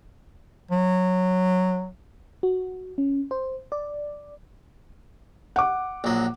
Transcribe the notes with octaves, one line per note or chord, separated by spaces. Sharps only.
F#3
F#4
C#4
C5
D5
F#5 D6
A#1 F#3